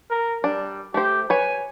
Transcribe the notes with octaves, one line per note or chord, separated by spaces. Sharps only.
A#4
G3 D4
A3 G4 C5
B4 C#5 G#5